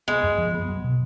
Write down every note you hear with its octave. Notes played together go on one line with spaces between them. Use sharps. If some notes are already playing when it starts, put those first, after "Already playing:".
G#3 B3
F#2
F3
B3
F#3
B2